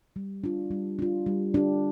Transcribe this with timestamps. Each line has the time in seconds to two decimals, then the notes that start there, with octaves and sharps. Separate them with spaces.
0.16 G3
0.44 D4 F4
0.71 G3
0.99 D4 F4
1.26 G3
1.54 D4 G4